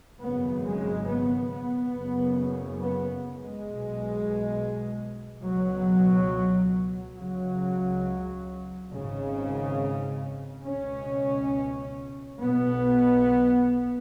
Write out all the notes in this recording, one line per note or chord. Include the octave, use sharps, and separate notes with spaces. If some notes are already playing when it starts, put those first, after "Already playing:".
G#1 F#2 C#3 B3
G#3
B3
B3
F#1 F#2 C#3
B3
G#3
B1 B2
C#2 B2 F#3
C#2 C#3 F#3
G#1 G#2 C#3
C#2 B2 C#4
B1 B2 B3